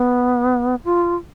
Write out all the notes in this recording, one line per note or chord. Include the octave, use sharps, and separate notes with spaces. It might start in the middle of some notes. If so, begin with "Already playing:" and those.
Already playing: B3
F4